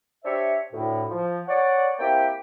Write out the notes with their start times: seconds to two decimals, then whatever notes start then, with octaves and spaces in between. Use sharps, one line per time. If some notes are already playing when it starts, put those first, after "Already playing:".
0.25 D4 G4 C5 C#5 E5
0.73 D2 A2
1.10 F3
1.47 C#5 D5 F#5
1.99 A#3 C4 E4 G4 G5